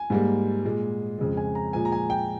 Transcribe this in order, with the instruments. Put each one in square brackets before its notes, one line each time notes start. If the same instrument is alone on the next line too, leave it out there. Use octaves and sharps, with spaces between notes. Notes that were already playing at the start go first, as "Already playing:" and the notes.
Already playing: [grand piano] G#5
G#2 G3 A#3
A#2 G#3
F2 C#3 G#3
G#5
A#5
A#2 F3 G#3 G#5
A#5
G#5
G5